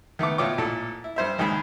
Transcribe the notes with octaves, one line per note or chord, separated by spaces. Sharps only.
D#3 A3 B3 D6
B2 A3 F4 C#5 G5 D6
A1 A#2 A4
E4
G2 C5 E5
D#2 D#3 G#3 G#4 B5